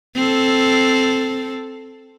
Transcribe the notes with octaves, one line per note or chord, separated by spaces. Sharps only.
C4 A4